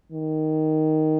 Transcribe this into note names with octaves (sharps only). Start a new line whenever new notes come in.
D#3